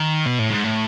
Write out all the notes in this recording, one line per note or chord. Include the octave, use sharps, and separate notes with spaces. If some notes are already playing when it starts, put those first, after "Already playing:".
Already playing: D#3
B2
A2
G#2
A2